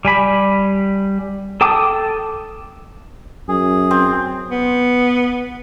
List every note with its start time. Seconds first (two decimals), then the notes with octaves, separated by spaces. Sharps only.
0.05 G3 G#5 B5
1.61 A4 G5 A5 D6 D#6
3.49 F#2 G#4
3.91 C4
4.51 B3